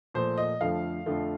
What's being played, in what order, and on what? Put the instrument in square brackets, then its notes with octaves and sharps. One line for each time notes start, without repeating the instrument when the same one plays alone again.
[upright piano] A#2 F3 A3 C5
D#5
F2 D3 F3 A3 F5
F2 D3 F3 A3